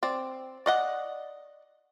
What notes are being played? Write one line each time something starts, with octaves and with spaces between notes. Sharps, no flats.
C4 D5
D5 D#5 F#5